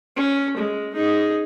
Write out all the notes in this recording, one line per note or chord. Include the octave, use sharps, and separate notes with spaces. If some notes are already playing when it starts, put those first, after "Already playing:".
C#4
G#3
D#4 G#4